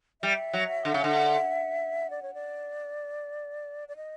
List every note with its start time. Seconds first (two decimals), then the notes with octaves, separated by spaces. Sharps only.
0.22 G3 E5
0.53 F#3
0.85 D3
0.94 C#3
1.04 D3
2.10 D5
2.23 C#5
2.34 D5
3.88 D5
3.96 D#5